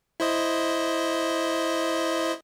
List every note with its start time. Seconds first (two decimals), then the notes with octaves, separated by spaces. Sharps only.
0.20 E4 C5 D#5